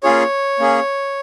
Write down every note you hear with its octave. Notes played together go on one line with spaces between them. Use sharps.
A#3 C#4 F4 G#4 C#5
A#3 C#4 G#4